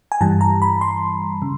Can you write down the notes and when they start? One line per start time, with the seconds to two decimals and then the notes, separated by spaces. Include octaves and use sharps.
0.12 G#5
0.21 G2 E3 G3 A5
0.41 A#5
0.62 B5
0.81 C6
1.42 C#3